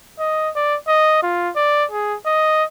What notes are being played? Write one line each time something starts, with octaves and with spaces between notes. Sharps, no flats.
D#5
D5
D#5
F4
D5
G#4
D#5